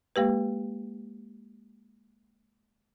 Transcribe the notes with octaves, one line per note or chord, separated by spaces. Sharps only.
G#3 A#3 G4 B4